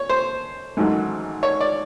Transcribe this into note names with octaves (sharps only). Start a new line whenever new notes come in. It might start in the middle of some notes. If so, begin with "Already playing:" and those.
Already playing: C#5
C5
A1 G#2 D#3 F#3
C#5
D5